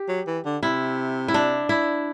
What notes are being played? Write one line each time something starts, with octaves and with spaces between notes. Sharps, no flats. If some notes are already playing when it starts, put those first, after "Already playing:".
Already playing: G4
F#3
E3
D3
C3 E4
E4
D4
E4